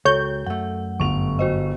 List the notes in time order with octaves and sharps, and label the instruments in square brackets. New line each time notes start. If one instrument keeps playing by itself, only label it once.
[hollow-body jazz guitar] C#2 [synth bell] F#4 A4 [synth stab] C#5 G6
[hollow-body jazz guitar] F#2 A3 [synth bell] F#5
[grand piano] G1 F7 [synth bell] C#6
[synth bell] F#4 C5 D#5